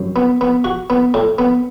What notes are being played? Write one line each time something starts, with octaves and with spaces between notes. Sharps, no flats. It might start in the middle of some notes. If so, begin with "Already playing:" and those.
Already playing: F#2
B3
B3
F#4
B3
A2
B3